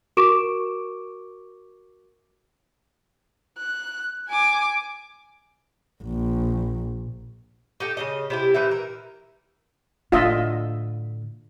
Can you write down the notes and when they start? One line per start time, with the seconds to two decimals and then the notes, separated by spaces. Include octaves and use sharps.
0.17 F#4 A#4 C#6 D6 D7 E7
3.58 F#6
4.29 G#5 D6
6.04 A#1
7.80 D#4 G4 A4
7.97 C#3 E3 D#5
8.30 C3 E4 G4
8.54 A#2 E3 D#4 E5
8.71 A#4
10.12 A2 D3 F4 D#5 E5